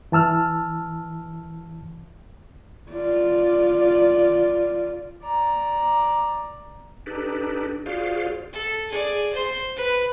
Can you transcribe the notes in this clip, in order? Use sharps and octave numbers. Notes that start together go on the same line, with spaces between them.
E3 A5 E6 F6
F4 D5
D5 A#5
D4 D#4 G4 A4 B4
F4 F#4 G#4 C5 D5 F5
A4
G#4 D5
C5 C6
B4